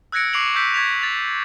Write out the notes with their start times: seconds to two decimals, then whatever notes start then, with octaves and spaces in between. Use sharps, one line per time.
0.12 E6 F#6 G#6 A#6 C#7 D7
0.33 C#6 D6 C7 D7 F7 F#7
0.54 C#6 E6 G6 B6 D7
0.74 C#6 G#6 B6 F7
1.02 A6 F7